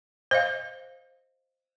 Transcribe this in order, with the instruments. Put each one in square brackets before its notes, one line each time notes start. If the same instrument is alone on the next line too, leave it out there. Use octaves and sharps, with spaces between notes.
[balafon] C5 D#5 F5